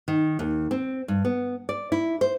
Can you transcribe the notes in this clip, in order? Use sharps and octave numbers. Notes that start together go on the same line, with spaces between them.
D#3
D#2
C4
G2
B3
D5
E4
C5